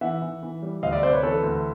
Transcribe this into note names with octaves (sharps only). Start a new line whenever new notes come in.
E3 E5 F#5
E3
E3
G3
D2 D#5 F5
D5 E5
C3 C5 D5
B4 C#5
E3 A4 B4
D2